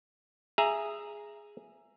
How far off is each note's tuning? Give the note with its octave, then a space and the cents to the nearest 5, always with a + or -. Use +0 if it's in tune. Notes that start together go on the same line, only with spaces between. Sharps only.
G#4 +0 E5 +15 A#5 +0